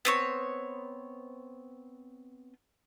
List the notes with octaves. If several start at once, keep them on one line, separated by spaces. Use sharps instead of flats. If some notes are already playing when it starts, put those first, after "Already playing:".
B3 C4 C#5